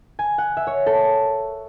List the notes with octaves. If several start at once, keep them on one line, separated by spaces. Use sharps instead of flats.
G#5
F#5
E5
C#5
A4